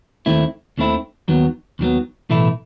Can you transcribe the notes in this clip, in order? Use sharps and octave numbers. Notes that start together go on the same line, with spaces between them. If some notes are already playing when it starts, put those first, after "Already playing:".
D#2 D#3 A3 C4 E4
D#2 D#3 A3 C4 E4
D#2 D#3 F#3 B3
D#2 D#3 F#3 B3
B1 A2 E3 A3 E4